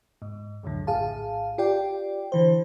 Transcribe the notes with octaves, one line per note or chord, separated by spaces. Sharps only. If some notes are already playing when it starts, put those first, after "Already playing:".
G#2
C#2 F#2 A2 D3
A#1 A2 G#4 F5 A5
F4 G4 D5 G5
D3 E3 C5